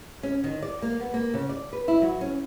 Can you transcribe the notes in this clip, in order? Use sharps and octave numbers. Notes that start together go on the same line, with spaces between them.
C#4
D#3
D5
A#3
B3
A#3
C#3
D5
B4
E4
F#3
C#4